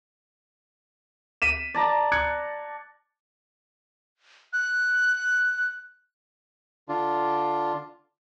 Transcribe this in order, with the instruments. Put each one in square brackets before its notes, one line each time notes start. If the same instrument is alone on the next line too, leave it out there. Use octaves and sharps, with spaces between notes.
[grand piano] B6 D#7 E7
[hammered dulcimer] D5 A5 A#5
[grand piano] F#6 G#6 C#7
[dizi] F#6
[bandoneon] D3 D4 F4